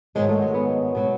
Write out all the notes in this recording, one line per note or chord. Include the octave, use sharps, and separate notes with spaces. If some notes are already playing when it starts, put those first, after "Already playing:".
G#2 D#3 F#3 G#3
A3
G#3
B3
B2 F#3